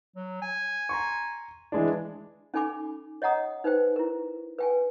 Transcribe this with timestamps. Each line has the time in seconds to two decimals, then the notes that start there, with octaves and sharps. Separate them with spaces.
0.16 F#3
0.42 G#5
0.89 A#5 C6 C#6
1.72 E3 G#3 D4
2.54 C#4 D#4 A4 G#5 B5 D6
3.22 C#5 D#5 F#5 A#5 D#6
3.64 D#4 B4 C5 G5
3.96 E4 A#4
4.58 B4 G5 G#5